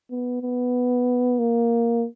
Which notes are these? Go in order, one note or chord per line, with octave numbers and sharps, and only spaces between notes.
B3
B3
A#3